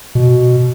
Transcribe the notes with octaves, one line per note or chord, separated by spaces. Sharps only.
B2